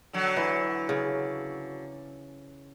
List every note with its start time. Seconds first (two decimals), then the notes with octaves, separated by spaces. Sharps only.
0.13 D3 F#3
0.37 E3
0.89 C#3